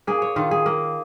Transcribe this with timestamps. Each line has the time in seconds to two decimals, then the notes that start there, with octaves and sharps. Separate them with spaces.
0.07 A#3 G#4
0.22 C#5
0.36 D#3 F4
0.51 G#4
0.66 A#3